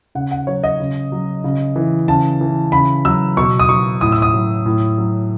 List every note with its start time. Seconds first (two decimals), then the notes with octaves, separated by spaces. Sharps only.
0.15 C#3 F#5
0.31 F#5
0.47 F#3 C#5
0.64 D#5
0.80 C#3
1.12 F#3
1.44 C#3
1.76 E3
2.08 C#3 A5
2.41 E3
2.72 C#3 B5
3.05 F#3 E6
3.37 B2 C#6
3.59 D#6
3.69 F#3 C#6
4.01 A2 D#6
4.12 E6
4.22 D#6
4.34 F#3
4.66 A2
4.98 F#3